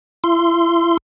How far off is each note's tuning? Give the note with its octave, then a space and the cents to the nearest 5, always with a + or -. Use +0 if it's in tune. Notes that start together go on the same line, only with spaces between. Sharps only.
E4 +35 C6 -10